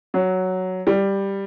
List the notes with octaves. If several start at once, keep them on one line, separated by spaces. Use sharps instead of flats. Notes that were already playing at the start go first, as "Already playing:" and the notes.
F#3
G3